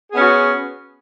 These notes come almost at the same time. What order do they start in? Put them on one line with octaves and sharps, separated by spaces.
G#4 B3 C#4 F#4